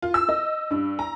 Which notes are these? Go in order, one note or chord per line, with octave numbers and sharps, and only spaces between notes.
F4
E6
D#5
G2
A#5